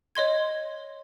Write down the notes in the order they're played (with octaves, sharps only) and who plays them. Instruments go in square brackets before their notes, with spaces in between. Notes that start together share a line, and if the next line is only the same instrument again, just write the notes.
[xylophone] C#5 D#5 C6 G#6